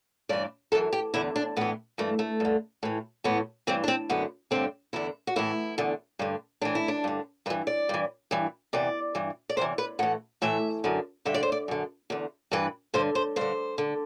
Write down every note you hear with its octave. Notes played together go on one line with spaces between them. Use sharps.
G2 E3 D5
F#2 E3 A4
G4
E2 D3 E4
D4
A2 E3 B3
G2 E3 A3
A3
G2 D3
A2 E3
A2 E3 B3
G2 E3 C4
D4
C4
F#2 D3 B3
G2 D3 C4
E2 D3 E4
F#4
A2 E3 E4
E2 D3
G2 D3
A2 E3 D4
E4
D4
G2 D3
G2 E3 B4
D5
G2 E3
G2 E3
E2 C3 E3 D5
G2 E3
D5
E2 C3 E3 C5
B4
A2 E3 F#5
A2 E3 E5
F#2 D3
G2 D3 E5
D5
C5
D5
F#2 D3
E2 D3
G2 E3 B4
G2 D3 C5
C5
G2 D3 C5
D3